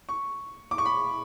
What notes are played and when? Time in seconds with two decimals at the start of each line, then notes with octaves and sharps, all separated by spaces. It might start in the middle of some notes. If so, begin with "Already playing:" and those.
0.09 C#6
0.71 D6
0.78 C#6
0.86 B5